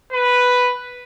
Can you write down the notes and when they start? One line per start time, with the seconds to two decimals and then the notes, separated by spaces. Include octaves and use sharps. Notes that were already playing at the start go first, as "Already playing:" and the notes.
0.12 B4